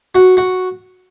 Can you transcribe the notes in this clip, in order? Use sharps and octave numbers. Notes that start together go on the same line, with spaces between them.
F#4
F#4